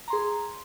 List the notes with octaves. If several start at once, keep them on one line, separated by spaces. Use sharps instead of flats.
G#4 A#5 C6